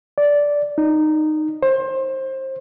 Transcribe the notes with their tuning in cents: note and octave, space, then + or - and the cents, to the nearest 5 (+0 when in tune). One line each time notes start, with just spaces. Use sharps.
D5 -10
D#4 -15
C5 +25